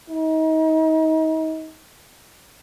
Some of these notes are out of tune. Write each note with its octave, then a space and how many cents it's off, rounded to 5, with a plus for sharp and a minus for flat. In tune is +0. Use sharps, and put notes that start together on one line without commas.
D#4 +35